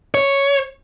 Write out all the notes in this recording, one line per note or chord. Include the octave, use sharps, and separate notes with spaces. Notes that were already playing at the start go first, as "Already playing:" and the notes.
C#5